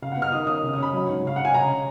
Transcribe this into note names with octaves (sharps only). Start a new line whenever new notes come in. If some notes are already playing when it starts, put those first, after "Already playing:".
C#3 F5
B3 F#5
F6
D#3 D#6
C#4 D#6
C#3
D#6
C#4 B5
F#3
G#2
C#3 F5
C#4 F#5
G#5
C#3 A#5